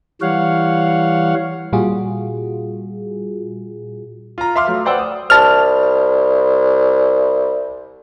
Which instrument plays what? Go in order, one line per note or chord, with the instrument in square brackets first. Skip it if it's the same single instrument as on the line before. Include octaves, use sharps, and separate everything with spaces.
[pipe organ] E3 G3 C#5 F5 F#5
[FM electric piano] A#2 G3 F4 F#4 G#4
[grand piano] F4 A#5
E5 F5 C6 D6 F6
F#3 A3
B4 C5 D5 F#5 G5 E6
D#6
[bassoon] C2 [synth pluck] A5 F6